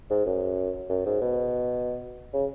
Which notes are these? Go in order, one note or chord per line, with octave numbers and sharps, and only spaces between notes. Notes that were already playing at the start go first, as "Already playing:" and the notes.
G#2
F#2
F#2
G#2
B2
C#3